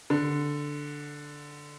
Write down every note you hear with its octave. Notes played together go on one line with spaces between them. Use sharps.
D3